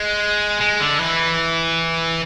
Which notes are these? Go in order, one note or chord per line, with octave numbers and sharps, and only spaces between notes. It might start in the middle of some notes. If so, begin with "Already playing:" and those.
Already playing: G#3
G#3
D3
E3